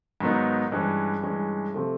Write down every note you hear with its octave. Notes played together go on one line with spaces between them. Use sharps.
G#2 D#3 F#3 B3 D#4
G2 E3 G#3 C#4
G2 E3 G#3 C#4
C3 F3 A3